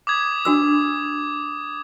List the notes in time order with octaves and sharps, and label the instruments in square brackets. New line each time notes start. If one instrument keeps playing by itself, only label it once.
[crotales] D6 D#6 G#6
[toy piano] D4 F#4 E6